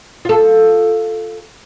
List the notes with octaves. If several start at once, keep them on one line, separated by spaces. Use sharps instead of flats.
F4 A4